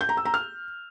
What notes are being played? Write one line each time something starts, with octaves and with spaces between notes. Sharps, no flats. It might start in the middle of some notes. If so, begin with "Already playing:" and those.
G6
A#5
E6
A#5
F6